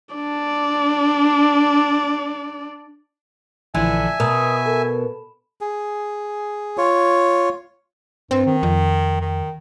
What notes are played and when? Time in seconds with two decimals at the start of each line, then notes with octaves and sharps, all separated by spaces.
0.15 D4 D5
3.75 A#1 D3 E3 F3 E5 G#5
4.20 B2 A#4 D#6
4.66 A4 A#4
5.61 G#4
6.77 F4 C#5
8.31 G2 C4
8.46 D#3
8.63 F2
9.21 D#3